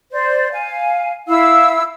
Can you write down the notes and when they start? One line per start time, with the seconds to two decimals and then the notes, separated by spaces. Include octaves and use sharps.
0.11 C5 D5
0.52 F5 G#5
1.28 E4 F5 E6